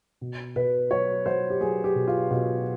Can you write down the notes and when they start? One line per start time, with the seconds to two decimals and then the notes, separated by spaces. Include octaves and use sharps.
0.21 B2
0.56 B2 B4
0.91 F#3 C#5
1.26 F#3 C5
1.50 G4
1.61 F#3 G#4
1.84 G4
1.95 B2
2.07 F4
2.31 B2 G4